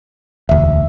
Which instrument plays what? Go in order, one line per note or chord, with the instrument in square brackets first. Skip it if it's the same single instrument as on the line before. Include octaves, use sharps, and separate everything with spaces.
[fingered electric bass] E1 D2 [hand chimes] E5